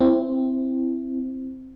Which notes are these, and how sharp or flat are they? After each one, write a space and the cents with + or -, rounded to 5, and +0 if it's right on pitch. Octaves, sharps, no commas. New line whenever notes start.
C4 +0 E4 +15